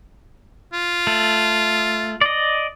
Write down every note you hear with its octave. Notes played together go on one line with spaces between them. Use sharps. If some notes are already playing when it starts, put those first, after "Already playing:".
F4
A3
D5 D#5